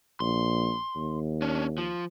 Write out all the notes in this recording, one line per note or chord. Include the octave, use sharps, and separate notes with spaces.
A#1 C6
D#2
C#4 D4
F3